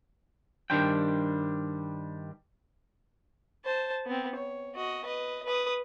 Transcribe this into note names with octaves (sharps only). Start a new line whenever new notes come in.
G2 D#3 G3 D4 C5 G5
C5 A5
B3 C4
C#5
F#4 D#5
B4 D#5
B4 D#6